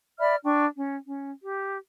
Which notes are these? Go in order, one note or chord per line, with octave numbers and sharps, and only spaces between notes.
D5 E5 B5 F6
D4 G5 C#6
C#4
C#4
G4